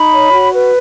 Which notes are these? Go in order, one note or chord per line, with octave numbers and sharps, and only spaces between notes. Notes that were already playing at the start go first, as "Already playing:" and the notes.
Already playing: D#4 B5
C#5
F#4
B4